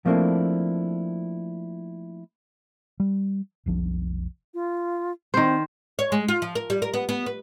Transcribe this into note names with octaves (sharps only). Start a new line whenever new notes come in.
F3 A3 A#3 C4 D4 E4
G3
F1 B1 F3
F4
D#3 C4 C5
C#5
G#3
F4
F3
A#4
G3
A#4
B3
B3
B4